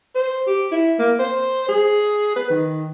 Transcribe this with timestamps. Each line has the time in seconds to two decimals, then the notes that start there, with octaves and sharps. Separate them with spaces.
0.15 C5
0.47 G4
0.72 E4
0.99 A#3
1.19 C5
1.68 G#4
2.36 B4
2.50 D#3